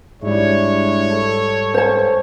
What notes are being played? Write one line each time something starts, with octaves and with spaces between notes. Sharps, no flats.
G#2 G3 G#3 D4 E4 C#5
A4
C5 A5